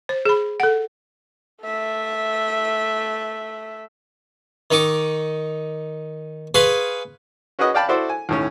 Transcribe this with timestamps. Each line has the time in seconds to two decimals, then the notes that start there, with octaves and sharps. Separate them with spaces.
0.09 C5
0.25 G#4 B5
0.60 A4 F#5
1.62 A3 E5
4.71 D#3 D#4 C#6 D6
6.54 G#4 B4 F5 G#5 C6 C#6
7.59 C#4 F#4 G#4 B4 D#5 F#5
7.74 D5 F5 G5 A5 B5
7.88 E4 F#4 A4 C5 D5
8.10 G#5
8.29 D#2 A2 C#4